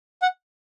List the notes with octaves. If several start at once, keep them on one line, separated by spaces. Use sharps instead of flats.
F#5